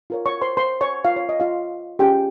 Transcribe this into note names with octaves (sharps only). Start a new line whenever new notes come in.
F4 A#4 C#5
C#5 C#6
C5 C6
C5 C6
C#5 C#6
F4 F5
C#5
D#5
F4 F5
C#4 F4 G4 G#4 G5